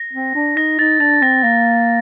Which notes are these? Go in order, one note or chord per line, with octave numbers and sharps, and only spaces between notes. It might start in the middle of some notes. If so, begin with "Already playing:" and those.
Already playing: A#6
C4
D4
D#4 A#6
D#4 A6
D4 A6
C4 A#6
A#3 A#6